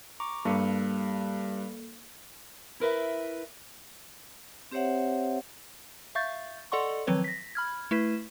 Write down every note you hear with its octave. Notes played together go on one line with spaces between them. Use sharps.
A#5 C#6 D6
G2 A#3 A4 C#7
E4 A#4 B4 E5
C4 G4 C5 C#5 E5 F#5
E5 F5 C#6 G6 A6
A4 D5 D#5 F#5 C6 C#6
D#3 F3 F#3 C4 B4 C#5
A#6 B6
B5 F6 G#6
A3 E4 B4 B6 E7